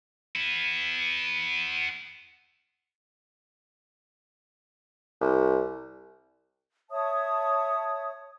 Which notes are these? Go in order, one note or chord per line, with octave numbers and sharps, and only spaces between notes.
B3 E4
C2
C#5 E5 A5 D#6